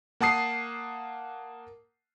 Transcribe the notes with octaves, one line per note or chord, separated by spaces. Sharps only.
A#3 F#5 A5 D#6 C7